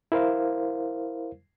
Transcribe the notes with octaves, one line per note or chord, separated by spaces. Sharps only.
E4 A#4 C5 F5